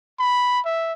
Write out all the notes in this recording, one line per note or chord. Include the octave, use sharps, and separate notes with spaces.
B5
E5